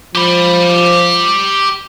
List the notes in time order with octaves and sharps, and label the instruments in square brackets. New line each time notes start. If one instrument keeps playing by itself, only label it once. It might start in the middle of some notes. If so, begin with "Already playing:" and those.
[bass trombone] F3 [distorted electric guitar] G4 B5